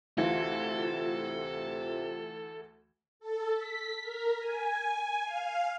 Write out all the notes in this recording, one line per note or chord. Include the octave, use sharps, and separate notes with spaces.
D2 C3 E3 F4 A4
A4
B6
A#4
G#5
F5